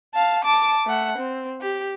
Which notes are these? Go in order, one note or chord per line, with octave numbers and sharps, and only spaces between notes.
F5 A5
A5 D6
A3 F#5
C4
G4